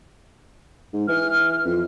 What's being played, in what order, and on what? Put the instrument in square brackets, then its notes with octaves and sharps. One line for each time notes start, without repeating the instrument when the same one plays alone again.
[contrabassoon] G#2
[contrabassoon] E3 [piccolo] F6
[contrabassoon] F2